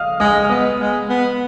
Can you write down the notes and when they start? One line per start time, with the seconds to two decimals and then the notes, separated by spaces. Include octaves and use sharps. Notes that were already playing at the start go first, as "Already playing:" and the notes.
Already playing: D#5 F5 D#6 F6
0.20 G#3 D#5 D#6
0.45 F6
0.50 B3 D#5 D#6
0.79 G#3
1.09 B3